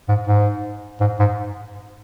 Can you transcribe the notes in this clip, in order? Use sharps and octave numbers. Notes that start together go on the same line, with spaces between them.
G#2
G#2
G#2
G#2